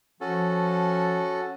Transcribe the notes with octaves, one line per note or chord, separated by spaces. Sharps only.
F3 C#4 F#4 A4